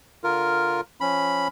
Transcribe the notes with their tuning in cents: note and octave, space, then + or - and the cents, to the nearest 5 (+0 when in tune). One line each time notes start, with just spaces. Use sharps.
D3 +0 F4 +0 A#4 +0
F3 +0 C#4 +0 B5 +0